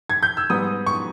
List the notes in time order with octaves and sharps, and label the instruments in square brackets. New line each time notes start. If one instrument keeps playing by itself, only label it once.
[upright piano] G#6
G6
E6
G#2 G3 B3 D#6
C#6